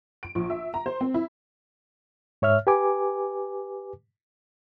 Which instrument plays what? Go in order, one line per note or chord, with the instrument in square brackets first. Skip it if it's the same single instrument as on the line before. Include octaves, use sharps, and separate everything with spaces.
[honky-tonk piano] D7
A#1
E5
A#5
C5
C4
E4
[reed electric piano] G#2 C#5 E5 F6
G4 B4 G#5 D6